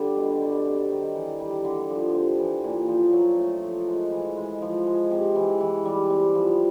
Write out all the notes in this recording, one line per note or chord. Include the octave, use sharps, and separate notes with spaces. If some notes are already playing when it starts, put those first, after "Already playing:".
Already playing: D3 G3
B2
G3
C3
D#3
E3
G3
D3
F3
C3
E3
A#2
F3
F#3
A3
F3
G#3
E3
G#3
F3
G#3
C3
E3
E3
G3
C3
F3